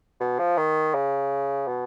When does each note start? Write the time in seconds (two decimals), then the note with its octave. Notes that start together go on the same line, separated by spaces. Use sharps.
0.21 B2
0.39 F3
0.58 D#3
0.95 C#3
1.68 B2